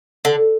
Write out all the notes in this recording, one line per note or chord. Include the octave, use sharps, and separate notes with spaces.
D3